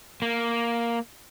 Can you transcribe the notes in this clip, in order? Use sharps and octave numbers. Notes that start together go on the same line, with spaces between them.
A#3